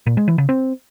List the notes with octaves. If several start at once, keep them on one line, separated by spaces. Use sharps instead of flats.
A#2
G#3
E3
C#3
C4